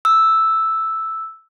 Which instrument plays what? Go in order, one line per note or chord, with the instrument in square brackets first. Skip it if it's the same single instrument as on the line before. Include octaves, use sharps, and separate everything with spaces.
[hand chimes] E6